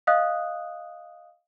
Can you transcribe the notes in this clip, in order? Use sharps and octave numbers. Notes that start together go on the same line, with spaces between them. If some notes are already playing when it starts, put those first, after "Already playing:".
D#5 F5 D#6 F#6